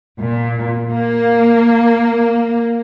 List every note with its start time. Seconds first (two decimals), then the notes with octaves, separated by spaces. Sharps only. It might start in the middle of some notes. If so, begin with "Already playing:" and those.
0.19 A#2
0.90 A#3